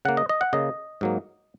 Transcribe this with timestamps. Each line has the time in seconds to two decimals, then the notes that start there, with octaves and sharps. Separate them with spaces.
0.05 C#3 A#3 F#5
0.17 D#5
0.29 D#5
0.41 F#5
0.53 C#3 A#3 D#5
1.01 G#2 F#3 A#3